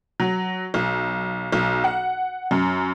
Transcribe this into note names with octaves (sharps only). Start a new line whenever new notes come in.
F#3
B1
B1
F#5
F#2